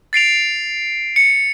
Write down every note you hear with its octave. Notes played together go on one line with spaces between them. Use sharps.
A6 C7 D7 F7
C#7